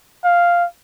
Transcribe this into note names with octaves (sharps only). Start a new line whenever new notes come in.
F5